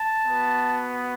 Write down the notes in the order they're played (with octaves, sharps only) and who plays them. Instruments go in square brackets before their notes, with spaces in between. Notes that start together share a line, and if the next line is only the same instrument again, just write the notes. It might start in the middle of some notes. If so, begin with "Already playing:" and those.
Already playing: [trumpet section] A5
B3 F#4